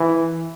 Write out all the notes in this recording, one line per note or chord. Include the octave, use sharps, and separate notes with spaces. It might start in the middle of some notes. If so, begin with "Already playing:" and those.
Already playing: E3